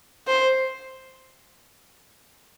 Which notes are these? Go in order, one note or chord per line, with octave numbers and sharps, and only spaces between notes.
C5